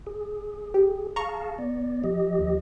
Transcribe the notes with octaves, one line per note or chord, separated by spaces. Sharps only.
G#4
G4
G#4 F5 A5 A#5 C#6
B3 D5
F3 G4 D#5
D#2